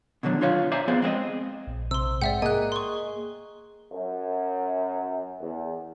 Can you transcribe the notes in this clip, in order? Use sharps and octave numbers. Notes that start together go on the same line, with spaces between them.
B2 D3 D#3 F#3 D4
D3 F4 C#5 D#5 F5
C5 D5 E5 F5 G#5 A#5
F2 B3 G#4 C5 D5 F5
G#3 C4 G#4 D#5
A#1
C3 C6 E6
G#2 D5 E5 F#5 G5
A#3 G#4 D#5 G#5 F#6
C6 C#6
F#2
E2